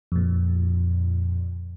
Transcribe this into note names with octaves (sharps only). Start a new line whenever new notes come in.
F2 A#2